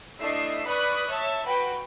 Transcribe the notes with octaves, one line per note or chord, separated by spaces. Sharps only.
A3 D4 E4 D#5 E5 C7
B4 D5 B5 C#6 D#6 F#6
C#5 E5 A5
F#4 B4 G5